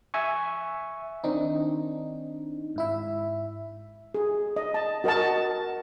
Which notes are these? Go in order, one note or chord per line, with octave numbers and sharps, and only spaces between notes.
E5 G#5 C#6
D#3 C4 D4 D#4
G#2 E4 E5
G#4
D#5
A5
F#4 A#4 D#5 F#5 A5